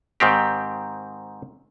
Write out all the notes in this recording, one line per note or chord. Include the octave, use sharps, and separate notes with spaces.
G#2 D#3 C4 G4